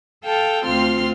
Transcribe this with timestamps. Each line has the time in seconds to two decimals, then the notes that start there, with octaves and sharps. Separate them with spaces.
0.24 A4 F5 G5 A5
0.64 D2 C4 F4 C6 F6